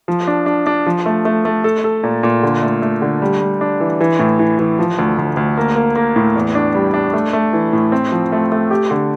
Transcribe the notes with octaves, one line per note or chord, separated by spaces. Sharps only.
F3
D4
D4
D4
F3
A3
A3
A3
A4
A4
A#2
A#2
D3
A3
A3
D3
G3
G3
D4
E3
E3
A2
E3
E3
F3
D2
D2
D2
A#3
A#3
A#3
A2
E2
D4
G3
D4
A3
A3
E3
A2
C4
F3
A3
A3
G4
D3